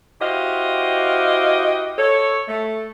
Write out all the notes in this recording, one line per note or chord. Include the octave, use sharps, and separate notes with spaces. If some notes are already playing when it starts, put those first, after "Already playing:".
E4 F#4 G4 C5 D#5 F5
A4 C#5
A3